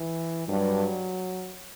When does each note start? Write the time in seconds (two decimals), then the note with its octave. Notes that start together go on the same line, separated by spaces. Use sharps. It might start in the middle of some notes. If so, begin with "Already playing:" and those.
Already playing: E3
0.48 G2 F#3